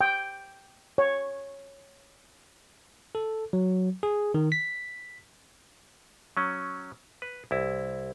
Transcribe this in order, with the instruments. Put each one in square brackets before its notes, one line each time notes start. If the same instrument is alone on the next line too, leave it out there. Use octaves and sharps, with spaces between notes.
[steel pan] G5
C#5
[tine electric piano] A4
F#3
G#4
D#3
B6
[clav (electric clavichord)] F#3 C#4
B4
C2 E4